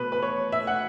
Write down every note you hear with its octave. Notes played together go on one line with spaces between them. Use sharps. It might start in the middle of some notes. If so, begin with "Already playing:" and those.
Already playing: B2 B3 B4
B4
C#5
E5
F#5